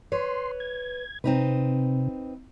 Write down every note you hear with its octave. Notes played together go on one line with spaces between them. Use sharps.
B4 C#5 C6
G#6
C3 C4 D#4 B4